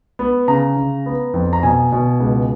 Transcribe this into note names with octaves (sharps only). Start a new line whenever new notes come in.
B3
C#3 A#5
C#3
B3
F2
A#5
B2 G#5
B2
C#2